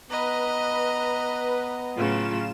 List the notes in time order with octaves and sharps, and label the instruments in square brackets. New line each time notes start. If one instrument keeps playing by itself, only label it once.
[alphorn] B3 [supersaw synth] B4 [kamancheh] D#5 A#5
[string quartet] A2 C#3 F#3 [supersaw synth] F4 E7